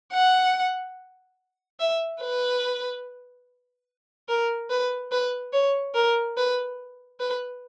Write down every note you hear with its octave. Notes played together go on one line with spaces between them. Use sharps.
F#5
E5
B4
A#4
B4
B4
C#5
A#4
B4
B4